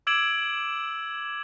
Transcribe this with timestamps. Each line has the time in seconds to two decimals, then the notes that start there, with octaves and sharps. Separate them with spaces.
0.07 D6 E6 G#6 D7 E7 F#7